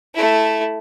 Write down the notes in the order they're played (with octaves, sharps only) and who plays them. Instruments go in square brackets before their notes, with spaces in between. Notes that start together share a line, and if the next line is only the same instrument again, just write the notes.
[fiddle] A3 E4